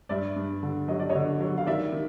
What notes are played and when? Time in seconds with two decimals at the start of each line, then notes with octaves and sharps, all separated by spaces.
0.09 G2 D5 E5
0.36 G2
0.63 D3
0.88 F#3 D#5
0.99 D5
1.09 C#5 D#5
1.15 D3
1.40 F#3
1.58 F5
1.67 D#3 D5 E5
1.93 D#3